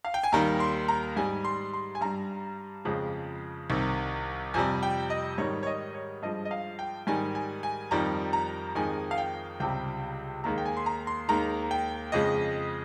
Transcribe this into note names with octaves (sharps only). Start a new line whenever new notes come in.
F5
G5
G#5
D#2 D#3 G3 A#5
C6
A#5
G#2 G3 G#5
C6
C6
G#5
G2 G3 A#5
F2 C#3 F3 G#3
C2 C3 D#3
F2 C3 G3 G#5
G5
D#5
G#2 D#3 G3 C#5
C#5
D#5
C#5
G2 F3 G#3 D#5
D#5
F5
G5
G#2 D#3 G3 G#5
G#5
G#5
F2 D#3 G3 A#5
A#5
F2 D#3 G#3 G#5
F5
G5
C#2 C3 G3 G5
D#2 D#3 G#3 A#5
G5
G#5
C6
A#5
C6
D#2 D#3 G#3 A#5
G5
F2 C#3 G#3 D#5